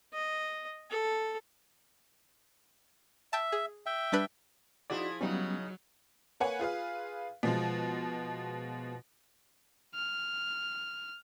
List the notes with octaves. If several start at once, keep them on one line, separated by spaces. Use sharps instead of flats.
D#5
A4
E5 G5 A5
G#4
E5 G5
G3 D4 B4
F3 D#4 E4 F#4 G#4 D5
C#3 F#3 G3 B3 C#4 D#4
A#3 B4 C#5 F#5 G#5
F4 G#4 B4 F5
B2 F3 G#3
F6